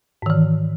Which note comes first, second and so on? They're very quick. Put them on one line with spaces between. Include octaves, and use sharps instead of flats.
G#2 D#3 E3